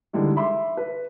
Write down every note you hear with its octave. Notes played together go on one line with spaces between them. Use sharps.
D3 E3 G3 G#3 D#4
E5 B5 C6 D6
B4